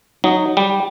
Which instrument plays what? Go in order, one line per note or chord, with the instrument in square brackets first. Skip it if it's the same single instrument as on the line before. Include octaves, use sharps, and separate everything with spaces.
[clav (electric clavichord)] F#3 [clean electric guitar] D#4
[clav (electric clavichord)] G3 [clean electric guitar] G5